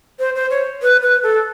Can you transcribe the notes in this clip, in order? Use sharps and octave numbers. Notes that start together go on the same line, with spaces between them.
C5
C5
C#5
B4
B4
A4